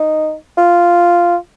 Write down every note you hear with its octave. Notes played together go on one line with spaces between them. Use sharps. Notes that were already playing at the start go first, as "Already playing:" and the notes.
Already playing: D#4
F4